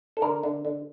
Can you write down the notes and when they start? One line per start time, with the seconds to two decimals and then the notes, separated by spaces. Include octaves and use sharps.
0.17 A4
0.22 D3 A#4
0.43 D3
0.65 D3